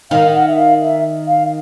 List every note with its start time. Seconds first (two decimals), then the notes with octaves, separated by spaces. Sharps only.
0.11 D#3 F5
0.34 F#5
0.47 E5
0.58 F5
0.81 E5
1.27 F5